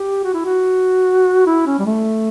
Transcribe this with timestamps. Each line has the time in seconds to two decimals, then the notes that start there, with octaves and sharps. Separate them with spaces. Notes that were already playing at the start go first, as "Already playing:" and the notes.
Already playing: G4
0.24 F#4
0.34 E4
0.45 F#4
1.46 E4
1.67 C#4
1.79 G3
1.86 A3